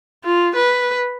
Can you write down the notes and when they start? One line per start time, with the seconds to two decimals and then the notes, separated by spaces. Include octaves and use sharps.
0.25 F4
0.56 B4